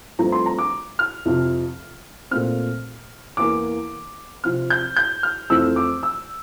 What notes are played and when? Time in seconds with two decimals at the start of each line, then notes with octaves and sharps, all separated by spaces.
0.19 G2 F3 A3 C4 A#5
0.32 C6
0.46 A#5
0.59 D6
0.99 F6
1.25 F2 C3 F3
2.31 A#2 A3 C4 F6
3.37 E2 E3 A#3 D6
4.44 C3 F3 C4 F6
4.70 G6
4.97 G6
5.23 F6
5.50 F2 E3 A3 C4 E6
5.76 D6
6.03 E6